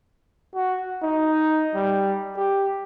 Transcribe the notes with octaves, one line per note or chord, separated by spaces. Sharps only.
F#4
D#4
G3
G4